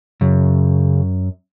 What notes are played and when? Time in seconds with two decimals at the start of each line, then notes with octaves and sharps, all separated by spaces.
0.21 F#2 C#3